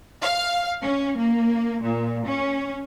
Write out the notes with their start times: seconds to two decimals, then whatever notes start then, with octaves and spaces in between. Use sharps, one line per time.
0.21 F5
0.82 C#4
1.17 A#3
1.82 A#2
2.27 C#4